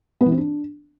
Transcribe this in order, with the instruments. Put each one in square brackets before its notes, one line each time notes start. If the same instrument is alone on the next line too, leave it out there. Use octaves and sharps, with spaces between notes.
[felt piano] B3
E3
C4
D4